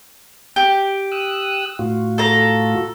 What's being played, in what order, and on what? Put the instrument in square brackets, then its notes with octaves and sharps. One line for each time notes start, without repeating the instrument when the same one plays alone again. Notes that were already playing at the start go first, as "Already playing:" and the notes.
[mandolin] G4
[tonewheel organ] D#6 E6 F#6
A2 F4 F#4
[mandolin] A4 A#5